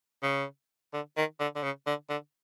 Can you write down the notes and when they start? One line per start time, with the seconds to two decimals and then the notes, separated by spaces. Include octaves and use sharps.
0.23 C#3
0.93 D3
1.17 D#3
1.40 D3
1.56 D3
1.63 C#3
1.86 D3
2.10 D3